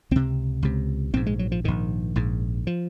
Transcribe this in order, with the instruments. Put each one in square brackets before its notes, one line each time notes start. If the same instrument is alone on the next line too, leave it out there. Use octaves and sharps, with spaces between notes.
[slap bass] C#2 C3 C4
C#2 C3
A#1 G#2 C4
G#3
F#3
F3
A#1 G#2 D#3
A#1 G#2
F3